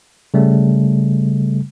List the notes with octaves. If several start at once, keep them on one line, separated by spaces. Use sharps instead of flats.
C#3 G3 A3